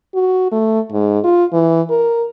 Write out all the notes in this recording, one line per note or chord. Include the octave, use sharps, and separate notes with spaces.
F#4
A3
G#2
F4
E3
A#4